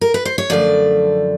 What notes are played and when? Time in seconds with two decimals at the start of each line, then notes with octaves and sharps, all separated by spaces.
0.01 A#4
0.14 B4
0.25 C5
0.38 C#5
0.50 F#2 D3 F3 A3 D5